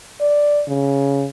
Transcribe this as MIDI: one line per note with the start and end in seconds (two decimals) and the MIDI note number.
0.21 0.63 74
0.68 1.26 49